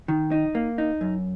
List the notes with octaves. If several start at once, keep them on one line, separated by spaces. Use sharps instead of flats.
D#3
D#4
A#3
D#4
F#2